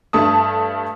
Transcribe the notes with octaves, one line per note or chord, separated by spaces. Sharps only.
G2 A3 A5 D#6